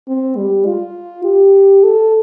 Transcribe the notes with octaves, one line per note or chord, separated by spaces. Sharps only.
C4
G3
F4
G4
A4